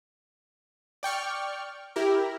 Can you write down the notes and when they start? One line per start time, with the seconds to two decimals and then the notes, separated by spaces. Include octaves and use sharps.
1.03 D5 G5 C#6 F6
1.96 E4 G4 A#4